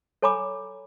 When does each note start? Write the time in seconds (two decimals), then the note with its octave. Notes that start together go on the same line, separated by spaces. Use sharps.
0.22 A4 C#5 G#5 A#5 B5 D6